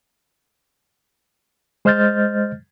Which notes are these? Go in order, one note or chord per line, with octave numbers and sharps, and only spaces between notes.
G#3 C5 D#5 F6 G6 A6